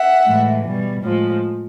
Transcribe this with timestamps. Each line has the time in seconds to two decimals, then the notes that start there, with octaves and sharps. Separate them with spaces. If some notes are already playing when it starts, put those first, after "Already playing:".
Already playing: E5 F#5
0.26 A2 E3 G#3
0.65 B2 G3
1.03 A2 F3 G#3